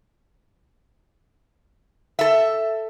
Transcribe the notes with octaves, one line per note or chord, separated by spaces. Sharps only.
A4 E5